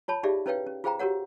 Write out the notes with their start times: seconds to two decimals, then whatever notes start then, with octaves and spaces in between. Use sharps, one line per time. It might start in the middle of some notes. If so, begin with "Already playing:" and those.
0.08 F4 C#5 A5 B5
0.23 D#4 G4 G#4 D5 E5 F5
0.46 C#4 E4 B4 C#5 F5 G5
0.67 C#4
0.84 F4 G#4 C5 F5 G5 A#5
0.99 F#4 G4 A#4 C#5 F#5